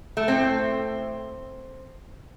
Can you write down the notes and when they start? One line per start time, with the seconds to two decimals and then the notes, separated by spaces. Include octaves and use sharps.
0.17 A3
0.28 A2 A3 C4